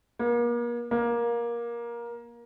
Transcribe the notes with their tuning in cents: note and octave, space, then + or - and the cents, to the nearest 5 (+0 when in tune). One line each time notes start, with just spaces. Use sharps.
A#3 +40
A#3 +20